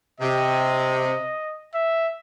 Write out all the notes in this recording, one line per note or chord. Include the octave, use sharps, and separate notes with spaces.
C3 D#5
E5